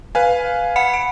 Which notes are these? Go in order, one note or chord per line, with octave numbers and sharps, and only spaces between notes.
B4 F5 G#5
F#5 B5 C#7
D7